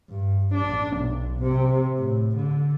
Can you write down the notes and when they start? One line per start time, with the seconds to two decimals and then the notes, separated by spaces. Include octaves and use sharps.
0.11 G2
0.55 D4
0.98 B1
1.40 C3
1.98 A2
2.36 D3